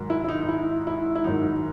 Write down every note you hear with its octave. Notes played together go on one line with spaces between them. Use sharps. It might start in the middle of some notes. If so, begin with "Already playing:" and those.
Already playing: G#2 D#3 F#3
E4
E4
D#4
D#4
E4
E4
E4
G#2 D#3 F#3 D#4